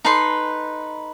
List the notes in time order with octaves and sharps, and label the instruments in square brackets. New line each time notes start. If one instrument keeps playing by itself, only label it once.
[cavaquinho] D#4 A4 B4 C6